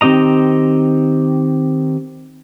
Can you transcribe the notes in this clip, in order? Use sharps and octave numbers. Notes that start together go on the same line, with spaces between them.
D#3 C4 G4 D#5 A#5